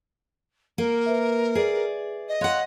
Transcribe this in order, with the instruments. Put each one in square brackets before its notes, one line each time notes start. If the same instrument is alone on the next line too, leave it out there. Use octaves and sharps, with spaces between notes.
[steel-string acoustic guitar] A#3 [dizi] A#4
[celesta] B4 E5
[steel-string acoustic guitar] G#4 D5
[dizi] D#5
[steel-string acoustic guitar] C#5 F#5 [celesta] F5 C6 F#6